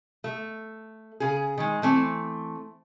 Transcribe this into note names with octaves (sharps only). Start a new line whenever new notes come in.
A3
C#3 G#4
D#3 G#3
E3 A3 C4